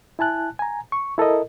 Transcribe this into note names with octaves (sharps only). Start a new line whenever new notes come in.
E4 G#5 A5 F#6
G#5 A#5
C#6
E4 A4 A#4 D#5